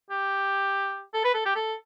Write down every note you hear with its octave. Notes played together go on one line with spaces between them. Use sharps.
G4
A4
B4
A4
G4
A4